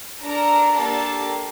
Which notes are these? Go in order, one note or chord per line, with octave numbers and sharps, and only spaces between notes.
D4 A4 A#4 A#5
A#3 D4 G4 A4 A5